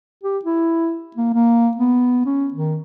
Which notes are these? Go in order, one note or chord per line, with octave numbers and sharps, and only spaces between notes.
G4
E4
A#3
A#3
B3
C#4
D#3